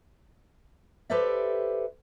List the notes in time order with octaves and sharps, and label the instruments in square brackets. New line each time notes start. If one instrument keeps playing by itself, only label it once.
[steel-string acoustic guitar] G4 A4 B4 C5 D5 E5